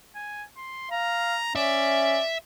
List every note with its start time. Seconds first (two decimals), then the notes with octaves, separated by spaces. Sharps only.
0.15 G#5
0.57 C6
0.91 F5 A#5
1.56 C#4 D5 E5